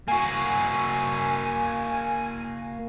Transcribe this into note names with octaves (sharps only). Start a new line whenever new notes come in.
A#3 F#4 G#5